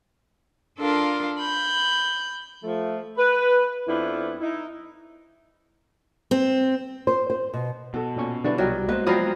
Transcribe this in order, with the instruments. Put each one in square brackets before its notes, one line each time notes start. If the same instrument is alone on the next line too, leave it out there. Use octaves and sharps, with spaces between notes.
[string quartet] D4 F4 A4 A#4 F5 C6
B5 G6
[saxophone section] F3 A3
B4
F2 B3 D4 E4
D#4 E4
[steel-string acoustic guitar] C4
[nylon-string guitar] C5
C5
B2
[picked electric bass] B2 [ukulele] F#4 A4
[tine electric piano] A#2 C#4 C#6
[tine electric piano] D3 G3 C#6 [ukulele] D4 E4 B4
[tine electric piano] C2 G3 [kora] F#3 [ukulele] F4 D#5 G5
[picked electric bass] G#3 A#3 B3 [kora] B4 [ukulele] C5 D#5
[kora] F3 F#3 F5 [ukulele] D5 B5 [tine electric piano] G5 A#5 D#6